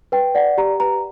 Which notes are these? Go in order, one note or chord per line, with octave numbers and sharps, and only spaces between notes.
B4 G5
D5 F#5
G4 A#5
B4 A#5